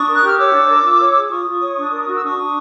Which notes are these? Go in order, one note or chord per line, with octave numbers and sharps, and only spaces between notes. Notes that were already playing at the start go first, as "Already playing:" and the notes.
Already playing: D4 C#6 D#6
A#4
F#6
G4 F6
C#5 D6 E6
D4
A#4
F4
C#5
G#4
F4 C#6 D#6
F4
C#5
D4
A#4
F#4
E6
D4 C#6 D#6
D4